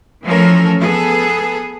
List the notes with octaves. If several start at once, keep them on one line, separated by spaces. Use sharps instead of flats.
E3 F3 A3 C#4 A4 A#4
B3 G#4 A4